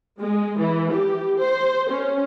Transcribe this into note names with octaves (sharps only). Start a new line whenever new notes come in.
G#3
E3
G4
C5
C#4